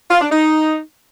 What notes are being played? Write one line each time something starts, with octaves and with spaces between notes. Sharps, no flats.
F4
D4
D#4